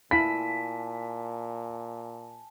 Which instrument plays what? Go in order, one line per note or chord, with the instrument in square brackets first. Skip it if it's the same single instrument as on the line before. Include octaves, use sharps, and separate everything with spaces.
[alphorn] A#2 [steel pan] E4 F5 B5 [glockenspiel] G#5 A5 [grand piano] B6